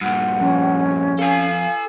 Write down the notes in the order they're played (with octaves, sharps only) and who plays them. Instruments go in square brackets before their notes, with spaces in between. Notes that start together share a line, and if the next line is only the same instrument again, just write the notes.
[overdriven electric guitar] G2 A#2 [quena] F#5
[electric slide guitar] F2 [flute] C#4
[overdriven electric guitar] A4 G#5 [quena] F5